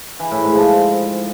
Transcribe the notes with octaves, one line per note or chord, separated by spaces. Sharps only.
E3
A2
G#2
F3